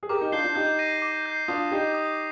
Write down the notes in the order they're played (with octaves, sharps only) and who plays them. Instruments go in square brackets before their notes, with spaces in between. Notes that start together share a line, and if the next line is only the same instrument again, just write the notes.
[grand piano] G#4
[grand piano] G4 A#4 [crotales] D6
[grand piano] D#4 G4
[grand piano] D4 F4 [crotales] G6 C7 G7
[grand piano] D4 F4
[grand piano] D#4 G4 [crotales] G6
[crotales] A#6 D#7
D6
G6 C7
[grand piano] D4 F4 [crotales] D#6
[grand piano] D#4 G4 [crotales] G6 C7
[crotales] D#6